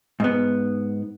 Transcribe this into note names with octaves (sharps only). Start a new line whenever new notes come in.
G#2 B3